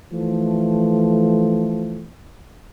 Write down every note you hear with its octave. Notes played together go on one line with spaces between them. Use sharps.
E3 F3 A3